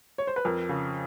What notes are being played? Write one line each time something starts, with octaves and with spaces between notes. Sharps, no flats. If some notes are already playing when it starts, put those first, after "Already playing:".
C#5
C5
B4
F2 A#4
C#3